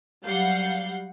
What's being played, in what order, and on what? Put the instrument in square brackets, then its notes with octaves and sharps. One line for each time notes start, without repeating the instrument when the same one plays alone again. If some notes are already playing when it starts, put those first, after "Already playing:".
[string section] F#3 G3 F5 F#5 G6 C7